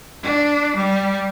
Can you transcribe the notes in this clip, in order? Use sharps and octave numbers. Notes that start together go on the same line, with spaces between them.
D4
G3